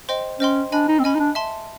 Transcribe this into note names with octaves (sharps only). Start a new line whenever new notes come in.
C5 D#5 G5 C6
C#4 C5 D#5 G5 C6
D4 D#5 G#5 B5
D#4
C4
C#4 D#5 G#5 B5
D#4
D4
E5 A5 C6